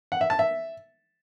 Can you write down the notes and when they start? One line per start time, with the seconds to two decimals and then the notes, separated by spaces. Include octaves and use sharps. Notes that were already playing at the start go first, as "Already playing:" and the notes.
0.12 F#5
0.21 E5
0.30 A5
0.39 E5